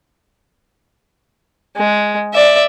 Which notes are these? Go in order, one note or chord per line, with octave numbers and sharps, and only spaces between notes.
G#3
D5 E5